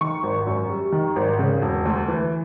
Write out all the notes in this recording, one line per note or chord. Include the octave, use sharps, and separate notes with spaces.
D#3 C#6
G#1
F#2
G3
D#3
G#1
C#3
E1
D2
E3